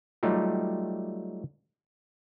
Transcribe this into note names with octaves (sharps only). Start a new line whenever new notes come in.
F#3 G3 A3 D#4 F4 G4